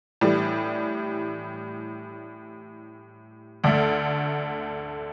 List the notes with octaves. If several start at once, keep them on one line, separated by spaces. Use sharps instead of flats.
A2 E3 G3
D2 D3 A3